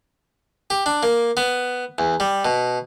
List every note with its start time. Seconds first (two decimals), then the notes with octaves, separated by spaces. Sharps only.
0.70 G4
0.86 D4
1.03 A#3
1.37 B3
1.98 E2
2.20 G3
2.45 B2